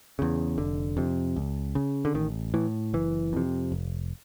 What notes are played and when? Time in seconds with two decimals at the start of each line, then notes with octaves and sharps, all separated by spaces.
0.19 E2 C#3
0.57 F1 D3
0.97 F2 C3
1.36 C#2
1.75 C#3
2.05 D3
2.14 A1 D#3
2.54 A2 E3
2.93 F#1 E3
3.33 F2 C3
3.72 F1